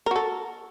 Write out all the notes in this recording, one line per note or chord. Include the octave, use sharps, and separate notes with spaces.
F#4 A4 A#4